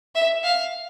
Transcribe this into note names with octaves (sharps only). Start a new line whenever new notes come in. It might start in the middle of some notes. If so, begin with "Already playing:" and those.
E5
F5